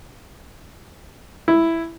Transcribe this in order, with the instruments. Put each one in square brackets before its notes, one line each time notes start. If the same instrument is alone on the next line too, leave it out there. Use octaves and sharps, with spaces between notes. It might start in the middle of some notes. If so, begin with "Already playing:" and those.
[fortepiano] E4